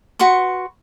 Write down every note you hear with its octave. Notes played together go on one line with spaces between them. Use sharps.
F#4 B4 C6 C#6